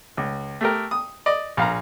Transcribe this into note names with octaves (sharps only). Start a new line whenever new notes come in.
C#2
A3 G4 A#4
D#6
D5 D#5
A#1 F5 A#5